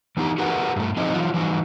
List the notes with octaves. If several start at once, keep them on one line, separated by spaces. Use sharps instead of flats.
E3 B3 D#4 G4
F#4 G#4 A#4 B4 F#5
G2 A3
F3 C4 D#4 F#4 G#4 D#5
E3 F#3 F4 F#4
E3 G3 D#4 F#4